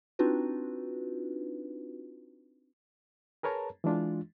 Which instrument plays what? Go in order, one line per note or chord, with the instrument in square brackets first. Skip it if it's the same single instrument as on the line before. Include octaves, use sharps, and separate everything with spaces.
[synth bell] C4 D4 D#4 F4 F#4 B4
[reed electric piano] G#4 A#4 B4 C#5 A5 A#5
E3 G#3 D4 F4